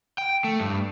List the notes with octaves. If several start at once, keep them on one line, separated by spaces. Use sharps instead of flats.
G5
A3
G2